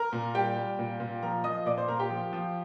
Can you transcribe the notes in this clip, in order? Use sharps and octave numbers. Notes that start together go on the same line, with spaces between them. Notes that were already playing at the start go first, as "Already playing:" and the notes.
Already playing: A#4 A#5
A#2
G3 G4 G5
G3
A#2
A#2
F3 A#4 A#5
F3 D#5 D#6
A#2 D5 D6
C5 C6
A#2 A#4 A#5
G4 G5
F3
F3